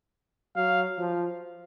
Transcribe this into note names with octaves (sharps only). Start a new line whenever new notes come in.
F#3 F5
F3